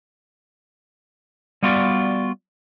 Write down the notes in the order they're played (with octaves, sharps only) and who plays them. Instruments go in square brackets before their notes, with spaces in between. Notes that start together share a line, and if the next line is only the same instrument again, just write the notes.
[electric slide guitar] G3 B3 F4 F#4 D5